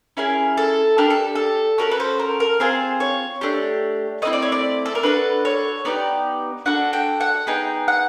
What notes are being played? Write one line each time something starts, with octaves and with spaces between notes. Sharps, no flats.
C#4 E4 G#4 A#4
A4
D4 G4 A#4
A4
A4
C#4 F#4 A4 A#4
B4
C5
A#4
A#4
C4 F4 G#4 C5
C#5
A3 D4 G4
A3 C4 E4 D#5
D5
C#5
D5
A4
A#4
D4 F#4 A4 B4
C#5
B3 D#4 G4 D5
D4 F#4 A4 F#5
G5
F#5
B3 D#4 G#4 G5
F#5